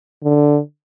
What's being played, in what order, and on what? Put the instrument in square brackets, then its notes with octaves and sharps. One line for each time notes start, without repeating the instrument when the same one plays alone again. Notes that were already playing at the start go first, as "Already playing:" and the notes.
[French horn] D3